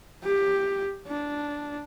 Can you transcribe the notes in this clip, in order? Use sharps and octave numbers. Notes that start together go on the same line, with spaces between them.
G4
D4